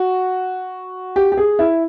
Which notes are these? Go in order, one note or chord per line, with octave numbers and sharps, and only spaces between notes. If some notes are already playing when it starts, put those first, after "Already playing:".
Already playing: F#4
G4
G4
G#4
E4